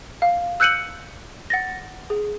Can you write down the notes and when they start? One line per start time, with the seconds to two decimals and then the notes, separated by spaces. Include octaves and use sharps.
0.22 F5
0.60 E6 F#6 G6 C#7 D#7 F#7
1.50 F#5 A6 A#6
2.10 G#4